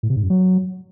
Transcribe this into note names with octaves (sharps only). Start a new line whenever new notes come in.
A2
C3
G#2
F#2
F#3